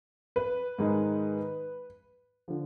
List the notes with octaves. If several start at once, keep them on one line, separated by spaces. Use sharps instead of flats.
B4
G#2 D#3 G#3 D#4
D3 F3